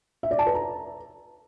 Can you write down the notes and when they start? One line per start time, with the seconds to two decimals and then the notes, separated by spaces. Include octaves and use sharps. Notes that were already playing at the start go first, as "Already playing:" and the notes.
0.23 E5
0.31 D5
0.39 A5
0.47 B4
0.54 A#5